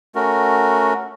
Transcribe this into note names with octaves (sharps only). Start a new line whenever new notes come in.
A3 C#4 F#4 A#4